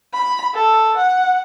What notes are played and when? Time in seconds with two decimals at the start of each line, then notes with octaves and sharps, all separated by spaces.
0.13 B5
0.54 A4
0.97 F#5